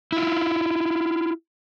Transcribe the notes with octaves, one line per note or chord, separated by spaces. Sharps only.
E4 F4